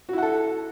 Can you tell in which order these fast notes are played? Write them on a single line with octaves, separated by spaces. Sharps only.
F#4 E4 F#5 A4